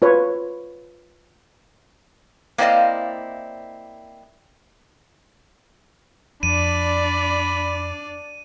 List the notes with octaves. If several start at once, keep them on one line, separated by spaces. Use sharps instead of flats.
F4 B4 C#5
A#3 C4 E4 D5 D#5 F5
F2 D4 D5 B5 D#7